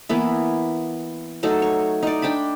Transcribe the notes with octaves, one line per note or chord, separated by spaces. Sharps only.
E3 A#3 B3 E4
F#3 A3 D#4 A4
C#5
D#4 D5
D4 G5 A5 B5